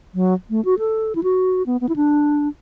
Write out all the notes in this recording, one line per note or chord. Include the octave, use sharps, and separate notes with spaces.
F#3
A3
F#4
A4
E4
F#4
B3
B3
E4
D4